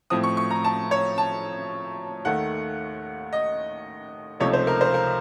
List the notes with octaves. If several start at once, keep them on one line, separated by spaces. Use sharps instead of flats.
A2 F3 C4 D#6
C#6
C#6
A#5
A5
C#5
A5
D#2 D#3 A3 F#5
D#5
C#2 C3 F3 A3 D#4 C#5
C5
A#4
C5
A#4